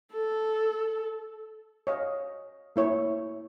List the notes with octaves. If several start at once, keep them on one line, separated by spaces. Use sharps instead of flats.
A4
C#5 D#5 F5
A#3 E4 C#5